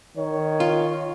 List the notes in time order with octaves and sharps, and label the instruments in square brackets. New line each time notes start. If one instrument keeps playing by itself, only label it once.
[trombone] D#3 [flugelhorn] C#5
[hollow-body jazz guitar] F4